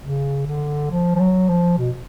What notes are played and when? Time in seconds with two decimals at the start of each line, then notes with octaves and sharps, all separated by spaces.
0.03 C#3
0.47 D3
0.91 F3
1.16 F3
1.20 F#3
1.49 F3
1.78 B2